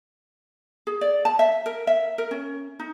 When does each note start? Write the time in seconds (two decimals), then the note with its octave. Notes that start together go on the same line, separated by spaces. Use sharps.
0.87 G#4
1.01 D5
1.25 A5
1.39 E5
1.66 A#4
1.87 E5
2.18 A#4
2.31 C#4
2.79 D#4